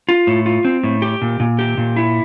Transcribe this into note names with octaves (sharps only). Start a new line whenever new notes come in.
F4
A2
F4
C4
A2
G4
A#2
A#2
G4
A#2
E4